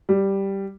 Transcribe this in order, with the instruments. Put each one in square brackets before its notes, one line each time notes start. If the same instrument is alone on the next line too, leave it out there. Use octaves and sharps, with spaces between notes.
[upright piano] G3